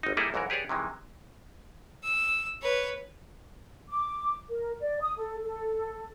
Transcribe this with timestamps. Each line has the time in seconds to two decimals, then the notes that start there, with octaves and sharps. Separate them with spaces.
0.03 G1 D#4
0.17 G3 A#3 D#4 E4 G#4 A4
0.34 B1 G#2 E3 F#4 A#4
0.50 G4 G#4 B4 C#5 D5
0.69 C3 D#3 E3 G#3
2.04 E6
2.62 B4 C#5
3.90 D6
4.49 A#4
4.81 D5
5.01 D#6
5.17 A4
5.42 A4